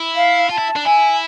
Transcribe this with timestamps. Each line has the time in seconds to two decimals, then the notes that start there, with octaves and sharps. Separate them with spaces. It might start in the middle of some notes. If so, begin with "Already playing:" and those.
Already playing: E4
0.16 F5
0.50 F4 A5
0.58 E4
0.76 D4
0.85 E4 G#5